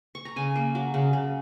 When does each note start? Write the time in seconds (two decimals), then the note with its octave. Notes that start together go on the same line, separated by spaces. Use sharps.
0.15 C#6
0.25 A#5
0.36 C#3 G#5
0.55 A#3
0.75 F#3
0.94 C#3
1.13 C#3